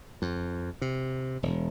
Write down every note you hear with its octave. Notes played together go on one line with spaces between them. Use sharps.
F2
C3
E1